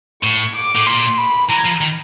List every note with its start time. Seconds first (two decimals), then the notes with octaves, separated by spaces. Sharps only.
0.23 A2 C#6
0.55 D6
0.76 A2
0.86 A#2 C6
1.18 B5
1.50 E3 A#5
1.65 F3
1.81 D#3